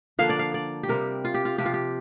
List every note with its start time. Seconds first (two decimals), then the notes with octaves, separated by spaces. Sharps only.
0.19 D3 F3 A#3 D4 F5
0.29 D5
0.39 F5
0.54 D5
0.83 G4
0.88 C3 G3 C4 A#4
1.25 F4
1.34 G4
1.45 F4
1.58 C3 F3 C4 G4
1.65 F4
1.74 G4